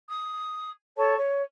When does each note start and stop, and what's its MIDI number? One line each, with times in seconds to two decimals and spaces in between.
0.08 0.69 87
0.97 1.16 69
0.97 1.16 73
0.97 1.16 81
0.97 1.16 85
1.16 1.41 73